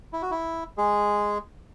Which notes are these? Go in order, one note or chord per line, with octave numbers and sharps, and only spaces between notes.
E4
F#4
E4
G#3 G#4